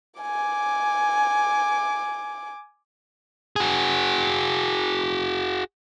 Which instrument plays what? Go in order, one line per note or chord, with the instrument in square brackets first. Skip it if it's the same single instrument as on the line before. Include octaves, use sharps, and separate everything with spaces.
[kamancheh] G#5 D6
[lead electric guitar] F#4 G#4